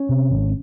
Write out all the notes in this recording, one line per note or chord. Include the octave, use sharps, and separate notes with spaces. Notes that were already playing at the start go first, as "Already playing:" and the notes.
Already playing: C#4
C3
G#1